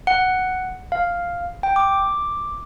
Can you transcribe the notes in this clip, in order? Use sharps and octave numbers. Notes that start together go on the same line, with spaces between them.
F#5
F5
G5
D6